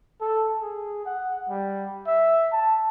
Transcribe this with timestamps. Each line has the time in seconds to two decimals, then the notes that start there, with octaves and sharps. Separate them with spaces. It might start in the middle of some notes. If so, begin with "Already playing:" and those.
0.21 A4
0.62 G#4
1.06 F#5
1.49 G3
2.07 E5
2.53 A5